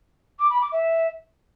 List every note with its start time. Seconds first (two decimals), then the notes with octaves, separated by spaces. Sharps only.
0.39 D6
0.50 B5
0.61 D6
0.72 E5